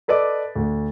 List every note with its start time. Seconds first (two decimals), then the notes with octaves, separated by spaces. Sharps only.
0.08 A4 B4 D5 D#5 D6
0.56 D2